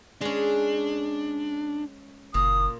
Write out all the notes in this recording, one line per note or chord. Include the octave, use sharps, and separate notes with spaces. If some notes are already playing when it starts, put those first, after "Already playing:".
G#3 C#4 D4
F#1 A#2 D#6